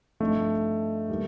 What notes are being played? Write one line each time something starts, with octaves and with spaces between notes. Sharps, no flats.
G2 F3 A3 C4 D#4
D#3 G3 A#3